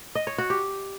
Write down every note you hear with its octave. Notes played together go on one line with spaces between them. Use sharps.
D#5
C#5
F#4
G4